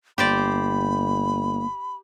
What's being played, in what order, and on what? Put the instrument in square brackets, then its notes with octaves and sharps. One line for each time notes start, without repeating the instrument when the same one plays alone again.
[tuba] G1 [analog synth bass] A#3 [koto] G4 C5 D5 [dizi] B5